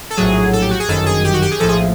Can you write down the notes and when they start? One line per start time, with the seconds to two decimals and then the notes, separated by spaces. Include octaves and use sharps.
0.10 A4
0.17 A#1 A2 F#3 G#4
0.53 A4
0.62 G4
0.70 F#4
0.80 G#4
0.88 G1 F#2 D#3 A4
1.06 G#4
1.24 G4
1.33 F#4
1.42 G4
1.51 G#4
1.60 A#1 A2 F3 A4
1.69 G#4